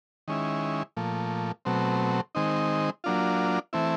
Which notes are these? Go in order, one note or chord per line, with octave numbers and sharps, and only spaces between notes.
D#3 G#3 C#4 E4
A#2 F3 A3
B2 F#3 A3 C4
D#3 G#3 C4 D#4
F#3 A#3 D4 F4
E3 A3 C4 E4